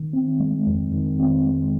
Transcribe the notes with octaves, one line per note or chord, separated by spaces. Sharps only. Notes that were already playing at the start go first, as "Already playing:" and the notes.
Already playing: D#3
C4
G#3
F2
D#3
C4
G#3